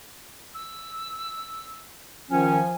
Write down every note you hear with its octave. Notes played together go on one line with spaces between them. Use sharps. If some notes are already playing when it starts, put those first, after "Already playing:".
E6
D#3 F3 C#4 G#5